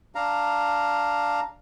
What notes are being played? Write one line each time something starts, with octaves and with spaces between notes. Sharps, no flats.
D4 F5 A#5